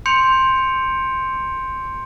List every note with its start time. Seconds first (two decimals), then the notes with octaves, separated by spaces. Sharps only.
0.06 C6 G6 C#7 D7 F7